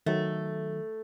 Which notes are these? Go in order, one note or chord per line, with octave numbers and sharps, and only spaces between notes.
D#3 F#3 A3